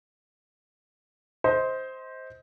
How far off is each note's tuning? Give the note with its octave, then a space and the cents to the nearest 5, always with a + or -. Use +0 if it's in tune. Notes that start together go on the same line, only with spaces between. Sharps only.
C5 +0 D#5 +30